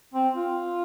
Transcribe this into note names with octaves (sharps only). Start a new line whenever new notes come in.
C4
F4